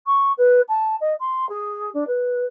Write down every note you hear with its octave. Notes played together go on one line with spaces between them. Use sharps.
C#6
B4
A5
D#5
C6
G#4
D4
B4